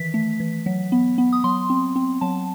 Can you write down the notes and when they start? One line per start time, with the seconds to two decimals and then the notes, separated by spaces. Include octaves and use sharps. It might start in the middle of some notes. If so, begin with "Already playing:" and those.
Already playing: D#3 E3 B6
0.14 A3
0.40 E3
0.66 F#3
0.92 B3
1.18 B3
1.33 D#6
1.44 F#3 C6
1.70 C4
1.96 C4
2.21 F#3 A5